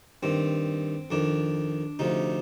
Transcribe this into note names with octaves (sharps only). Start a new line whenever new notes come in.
G2 D#3 C4
F2 D#3 D4
D2 C3 F3 D#4